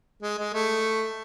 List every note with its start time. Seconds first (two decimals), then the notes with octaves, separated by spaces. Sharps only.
0.22 G#3
0.38 G#3
0.53 A3